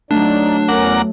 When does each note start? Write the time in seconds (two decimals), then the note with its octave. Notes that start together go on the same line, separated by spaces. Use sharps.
0.11 F#3 A3 D4 D#4 D5
0.68 E2 C#4 A#4 F#5 A#5 D6